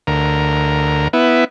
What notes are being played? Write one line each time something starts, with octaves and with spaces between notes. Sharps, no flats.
D2 A#4
B3 E4